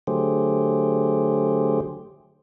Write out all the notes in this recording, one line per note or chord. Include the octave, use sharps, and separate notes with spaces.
D3 F#3 A3 G4 G#4 C5